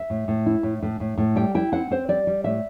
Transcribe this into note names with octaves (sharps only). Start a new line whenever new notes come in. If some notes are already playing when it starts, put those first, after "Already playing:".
Already playing: E5
A2
A2
E4
A2
A2
A2
A2
G3 G5
E4 G5
C4 F#5
C4 C5
G3 D5
G3
A2 E5